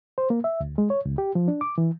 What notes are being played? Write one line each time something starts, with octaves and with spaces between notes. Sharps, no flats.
C5
A#3
E5
D2
G#3
C#5
C#2
G4
F3
D4
D6
E3